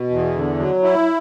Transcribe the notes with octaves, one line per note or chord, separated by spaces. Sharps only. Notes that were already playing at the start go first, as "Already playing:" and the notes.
Already playing: B2
E2
D3
F#3
E4